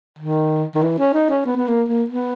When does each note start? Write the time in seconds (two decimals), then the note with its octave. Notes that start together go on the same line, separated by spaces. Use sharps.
0.19 D#3
0.75 D#3
0.82 E3
0.98 C#4
1.14 D#4
1.30 C#4
1.46 B3
1.57 B3
1.68 A#3
1.88 A#3
2.10 B3